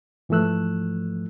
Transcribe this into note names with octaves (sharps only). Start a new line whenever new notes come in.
G#2 E3 F3 A3 E6 F#6